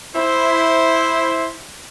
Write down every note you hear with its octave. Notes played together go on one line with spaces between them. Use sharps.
E4 C5